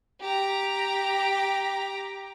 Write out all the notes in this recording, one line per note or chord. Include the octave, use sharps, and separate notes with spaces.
G4 A#5